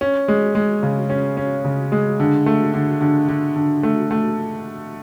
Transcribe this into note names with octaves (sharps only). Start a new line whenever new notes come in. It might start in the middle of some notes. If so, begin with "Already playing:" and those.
C#4
G#3
G#3
C#3
C#4
C#4
C#3
G#3
D3
A3
D3
D3
D3
D3
A3
A3